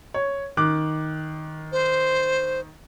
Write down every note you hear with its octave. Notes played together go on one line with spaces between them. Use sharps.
C#5
D#3 D6 F#6
C5